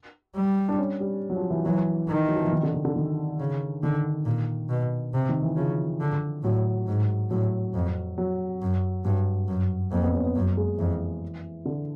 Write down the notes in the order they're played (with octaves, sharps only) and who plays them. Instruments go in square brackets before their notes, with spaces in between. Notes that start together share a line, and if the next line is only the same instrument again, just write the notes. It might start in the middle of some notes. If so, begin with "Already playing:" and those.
[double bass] G3
[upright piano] D4
C#4
G3
F#3
F3
E3
[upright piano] E3 [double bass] F#3
[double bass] D#3
[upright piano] F#3
F3
E3
D#3
D3
D#3
D3
D#3
[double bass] C#3
[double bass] D3 [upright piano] D#3
[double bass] A#2
B2
C3
[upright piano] D#3
E3
[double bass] C#3 [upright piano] F3
[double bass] D3
[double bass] A2 [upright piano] F#3
[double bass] G#2
[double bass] A2 [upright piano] F#3
[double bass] F2
[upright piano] F#3
[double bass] F#2
[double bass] G2 [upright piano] F#3
[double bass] F#2
[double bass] F2 [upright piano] A#3
[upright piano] C4
B3
C#4
B3
[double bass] F#2 [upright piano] A#3
[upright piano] G#3
[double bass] F2 [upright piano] E3
[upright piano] D3